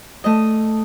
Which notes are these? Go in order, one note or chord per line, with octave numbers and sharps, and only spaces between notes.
A3 D#5